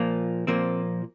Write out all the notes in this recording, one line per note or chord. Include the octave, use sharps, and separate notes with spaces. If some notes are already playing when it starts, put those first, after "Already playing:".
Already playing: A#2 F3 A#3
A#2 F3 A#3 C4